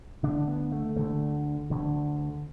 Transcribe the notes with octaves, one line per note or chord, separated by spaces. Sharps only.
D2 D3 D4
B3
A3
D2 D3 A3
D2 D3